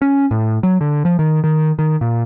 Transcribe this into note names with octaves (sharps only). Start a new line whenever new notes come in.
C#4
A2
F#3
D3
F3
D#3
D#3
D#3
A#2